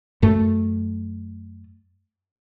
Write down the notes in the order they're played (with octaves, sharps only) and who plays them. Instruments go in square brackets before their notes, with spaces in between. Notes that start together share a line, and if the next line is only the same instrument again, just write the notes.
[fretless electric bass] F#2 A3